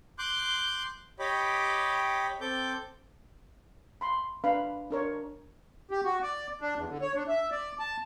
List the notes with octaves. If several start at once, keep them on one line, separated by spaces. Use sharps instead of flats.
C6 D6 F#6 G6
G4 C#5 D#5 G5 B5 D6
C4 A4 D6 G6
B5 C6
D4 B4 F5 A#5 B5
D4 A#4 C#5
G4
F#4
D5
D4
E2
D3
C#5
D4
E5
D5
A5